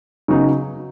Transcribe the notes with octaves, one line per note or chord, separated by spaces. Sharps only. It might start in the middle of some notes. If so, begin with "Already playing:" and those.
C#3 F#3 B3 D#4